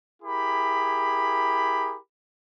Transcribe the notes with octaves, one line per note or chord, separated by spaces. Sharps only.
E4 G4 G#4 A#4 B5